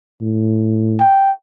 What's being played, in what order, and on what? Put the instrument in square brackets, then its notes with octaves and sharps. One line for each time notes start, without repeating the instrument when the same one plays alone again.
[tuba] A2
[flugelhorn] G5